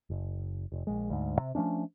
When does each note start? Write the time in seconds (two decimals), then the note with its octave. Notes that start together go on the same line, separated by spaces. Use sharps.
0.10 F#1
0.72 F1
0.87 A#1 G#3
1.10 D2 G#2
1.39 C3
1.55 F3 A3 C#4 D4